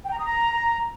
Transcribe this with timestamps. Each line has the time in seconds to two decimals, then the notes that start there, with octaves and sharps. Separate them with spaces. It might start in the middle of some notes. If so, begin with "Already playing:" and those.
0.04 G5
0.11 A#5
0.18 D#6
0.25 A#5